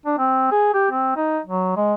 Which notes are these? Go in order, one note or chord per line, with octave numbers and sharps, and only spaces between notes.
D4
C4
G#4
G4
C4
D#4
F#3
G#3